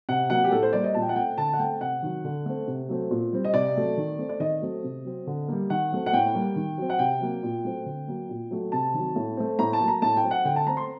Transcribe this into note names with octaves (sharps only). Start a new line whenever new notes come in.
C3 F#5
F#3 A#3 F#5
G4
A2 A4
C5
G3 A#3 D5
D#5
A#2 A5
G5
F#5
A3 C4 G5
D3 A5
F#5
A3 C4 G5
C3 F#5
D#3 F#3
D3
A3 C4
C3
F#3 A3 C4
A#2
G3 C4
D#5
C3 D5
F#3 A3
D#3
A3 C4
D5
D#3 D#5
F#3 A3 C4
C3
F#3 C4
D3
G3 A#3
D#3 F#5
F#3 A3 C4
F#5
A2 G5
G3 A#3
D#3
F#3 C4
F#5
C3 G5
F#3 A#3
A#2
F#3 A3 C4
D3
F#3 A#3
A#2
F#3 A3
C3 A5
D#3 F#3
A2
A3 C4
A2 A#5
A5
F#3 A#3
A#5
A2 A5
G5
F#3 C4
F#5
D3 G5
A5
A3 C4 A#5
C6